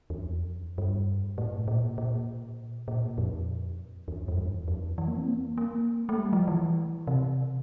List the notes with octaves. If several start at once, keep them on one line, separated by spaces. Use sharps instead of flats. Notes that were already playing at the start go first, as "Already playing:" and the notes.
E2
F2
G2
A2
A#2
A#2
A#2
F2
E2
F2
G2
E2
F2
E3
A#3
C4
A#3
A#3
A3
G3
F3
E3
C3